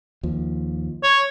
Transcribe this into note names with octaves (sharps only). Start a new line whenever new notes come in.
D#2 F3
C#5